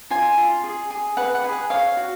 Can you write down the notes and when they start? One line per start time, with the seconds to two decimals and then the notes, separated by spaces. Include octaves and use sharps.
0.10 F4 G#5
0.37 F4
0.64 G#4
0.90 G#4
1.17 B4 F#5
1.35 F#5
1.44 G#4
1.52 F#5
1.70 C#5 F5
1.97 F#4